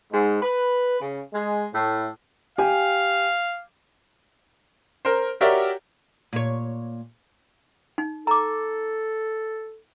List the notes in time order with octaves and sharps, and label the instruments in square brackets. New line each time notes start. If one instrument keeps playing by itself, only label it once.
[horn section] G#2
B4
C#3
G#3
A2
[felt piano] G4 G5 G#5 [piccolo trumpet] F5
[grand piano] A#4 C5
F#4 G4 A#4 C#5 D5 E5
[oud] A#2 C#5
[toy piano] D#4
[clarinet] A4 [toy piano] A#5 D6